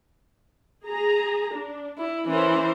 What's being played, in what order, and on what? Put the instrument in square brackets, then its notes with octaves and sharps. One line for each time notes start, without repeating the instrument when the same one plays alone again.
[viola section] G#4 A#5
D4
[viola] E4
[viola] E3 C5 [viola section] C#4 A#4